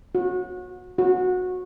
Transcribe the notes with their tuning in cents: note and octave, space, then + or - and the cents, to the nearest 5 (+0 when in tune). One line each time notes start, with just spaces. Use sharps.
F#4 -30
F#4 -20